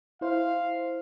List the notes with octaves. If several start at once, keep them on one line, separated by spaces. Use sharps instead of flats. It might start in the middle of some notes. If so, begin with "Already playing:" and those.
E4 C5 F5